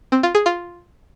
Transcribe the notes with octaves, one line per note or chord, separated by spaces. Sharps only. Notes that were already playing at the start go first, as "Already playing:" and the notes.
C4
F4
G#4
F4